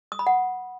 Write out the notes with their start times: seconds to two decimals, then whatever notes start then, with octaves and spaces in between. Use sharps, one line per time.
0.12 D#6
0.19 B5
0.27 F#5